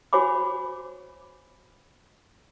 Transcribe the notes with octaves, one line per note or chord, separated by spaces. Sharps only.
F#4 C5 C#5 G#5 B5 D6